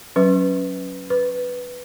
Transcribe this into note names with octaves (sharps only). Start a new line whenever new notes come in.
F#3 C#4 B4
B4